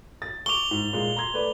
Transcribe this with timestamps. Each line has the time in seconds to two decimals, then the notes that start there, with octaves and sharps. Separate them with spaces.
0.22 A6
0.46 C#6 D6 F7 G7
0.71 G#2
0.93 A#2 G#3
1.16 A#5 C6 G#6
1.34 A3 B4 D5